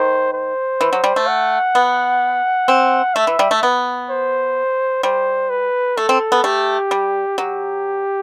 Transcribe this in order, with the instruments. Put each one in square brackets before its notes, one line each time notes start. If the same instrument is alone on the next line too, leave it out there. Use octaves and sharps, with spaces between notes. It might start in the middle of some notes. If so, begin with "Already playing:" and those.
Already playing: [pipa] D#3 [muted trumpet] C5
[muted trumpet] C5
[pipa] E3
F#3
G3
A3
[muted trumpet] F#5
[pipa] B3
C4
[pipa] A3 [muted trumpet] E5
[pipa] E3
G3
A3
B3
[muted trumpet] C5
[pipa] G3 [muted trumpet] C5
[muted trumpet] B4
[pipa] A3 [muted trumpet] A4
[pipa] C4
B3
[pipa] A3 [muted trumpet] G4
[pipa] G3
[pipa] F#3 [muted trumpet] G4